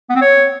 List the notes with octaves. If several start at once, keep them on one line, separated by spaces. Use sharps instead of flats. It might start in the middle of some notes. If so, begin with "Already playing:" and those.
B3
C4
C#5